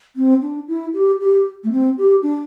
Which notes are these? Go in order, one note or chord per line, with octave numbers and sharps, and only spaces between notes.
C4
D4
E4
G4
G4
A3
C4
G4
D4